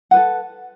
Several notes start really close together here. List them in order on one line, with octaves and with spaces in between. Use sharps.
F#5 B4 A4